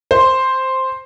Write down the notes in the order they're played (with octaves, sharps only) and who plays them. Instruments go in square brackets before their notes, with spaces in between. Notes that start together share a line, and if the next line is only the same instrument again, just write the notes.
[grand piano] C5